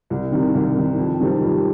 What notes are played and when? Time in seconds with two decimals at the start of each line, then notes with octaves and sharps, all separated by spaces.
0.10 C2
0.32 C3 D#3
0.55 C2
0.76 C3 D#3
0.98 F2
1.20 C3 D#3 G3 C4
1.41 F2